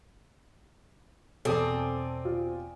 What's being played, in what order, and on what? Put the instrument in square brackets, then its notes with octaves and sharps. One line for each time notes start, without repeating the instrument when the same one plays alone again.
[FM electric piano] E2 B2 [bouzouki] C4 [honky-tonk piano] A4 A5 [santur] D5 G#5 D#6
[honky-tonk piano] F4